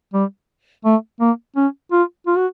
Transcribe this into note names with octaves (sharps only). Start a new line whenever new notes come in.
G3
A3
A#3
C#4
F4
F4
F#4